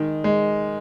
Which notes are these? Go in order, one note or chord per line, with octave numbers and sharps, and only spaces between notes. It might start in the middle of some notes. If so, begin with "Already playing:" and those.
Already playing: D#3 G#3
G#3